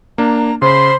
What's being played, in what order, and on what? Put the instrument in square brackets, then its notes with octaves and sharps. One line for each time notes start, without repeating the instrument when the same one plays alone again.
[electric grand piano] A#3 D4 [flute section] A#5
[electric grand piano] C#3 [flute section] C5 B5 [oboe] C6